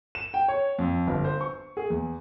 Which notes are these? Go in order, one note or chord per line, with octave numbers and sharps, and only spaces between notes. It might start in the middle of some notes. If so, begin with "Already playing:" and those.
E7
G5
C#5
F2
G1
C5
C#6
G#4
E2